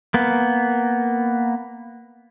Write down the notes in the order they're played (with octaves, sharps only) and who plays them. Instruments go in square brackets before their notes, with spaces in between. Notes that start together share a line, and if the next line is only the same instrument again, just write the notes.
[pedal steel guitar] A#3 B3